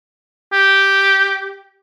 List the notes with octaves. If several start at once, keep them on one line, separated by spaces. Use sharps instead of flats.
G4